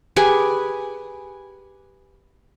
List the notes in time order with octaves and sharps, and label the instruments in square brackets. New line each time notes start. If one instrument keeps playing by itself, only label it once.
[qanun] G4 G#4 B4 G#5